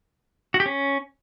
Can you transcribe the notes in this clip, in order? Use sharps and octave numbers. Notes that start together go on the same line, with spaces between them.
F#4
G4
C#4